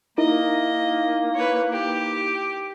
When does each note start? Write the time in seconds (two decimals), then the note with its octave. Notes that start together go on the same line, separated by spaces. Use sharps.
0.18 A#3 D#4 E4 A#4 D#5
1.35 B4 C#5
1.72 G4